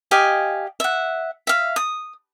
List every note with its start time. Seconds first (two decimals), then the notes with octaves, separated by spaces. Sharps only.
0.11 G4 D#5 F5 G#5
0.80 E5 F#5
1.47 E5 F5
1.76 D#6